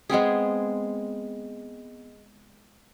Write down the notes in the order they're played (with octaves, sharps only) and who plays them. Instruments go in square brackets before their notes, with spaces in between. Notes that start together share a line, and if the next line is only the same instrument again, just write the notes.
[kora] G#3 B3 C4 G#4